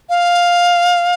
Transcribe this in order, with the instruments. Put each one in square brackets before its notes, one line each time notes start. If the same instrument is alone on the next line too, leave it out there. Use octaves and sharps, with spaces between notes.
[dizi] F5